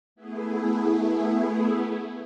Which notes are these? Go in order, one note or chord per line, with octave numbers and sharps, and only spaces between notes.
A3 B3 E4 G#4